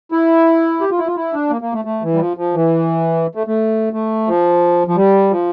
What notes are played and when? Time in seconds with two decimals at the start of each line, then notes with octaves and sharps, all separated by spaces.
0.12 E4
0.81 G4
0.91 F4
0.99 E4
1.07 F4
1.16 E4
1.33 D4
1.50 A#3
1.61 A#3
1.73 A3
1.85 A3
2.03 E3
2.14 G3
2.19 F3
2.37 F3
2.54 E3
3.35 A3
3.47 A3
3.93 A3
4.27 F3
4.87 F3
4.96 G3
5.31 F3